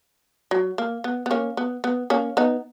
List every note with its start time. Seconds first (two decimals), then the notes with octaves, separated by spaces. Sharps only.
0.51 F#3
0.78 A#3
1.04 B3
1.26 B3
1.31 A#3 C#4
1.57 B3
1.84 B3
2.10 A#3 C#4
2.37 B3 D#4